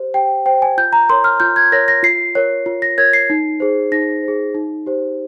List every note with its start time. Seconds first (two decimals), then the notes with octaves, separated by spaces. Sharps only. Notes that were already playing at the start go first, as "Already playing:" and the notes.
Already playing: G4 C5
0.14 G4 G5
0.46 C5 G5
0.62 G#5
0.78 F4 G6
0.93 A#5
1.09 A#4 C#5 C6
1.24 F6
1.40 F4 G6
1.56 G#6
1.72 A#4 C#5 A#6
1.88 A#6
2.03 F4 C7
2.35 A#4 C#5
2.66 F4
2.82 A#6
2.98 A#4 C#5 G#6
3.13 C7
3.30 D#4
3.60 G#4 C5
3.92 D#4 A#6
4.23 C5
4.28 G#4
4.55 D#4
4.86 G4 C5